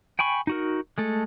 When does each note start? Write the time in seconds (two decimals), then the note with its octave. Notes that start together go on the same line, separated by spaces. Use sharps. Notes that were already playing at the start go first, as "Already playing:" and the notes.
0.19 G5 G#5 B5 C#6
0.47 D#4 F#4 A#4
0.98 G#3 A3 A4